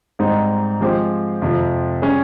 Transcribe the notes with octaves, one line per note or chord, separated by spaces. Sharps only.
G#2 G3 C4 D#4
F3 G#3 C4 G4 C5
F2 C3 F3
G3 C#4 G#4